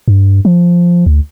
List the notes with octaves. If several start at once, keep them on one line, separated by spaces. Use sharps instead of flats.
G2
F3
D2